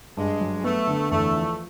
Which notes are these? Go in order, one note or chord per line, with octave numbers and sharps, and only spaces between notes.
G2 G#3
F#3
A3 B3
D3
E2 A3
F3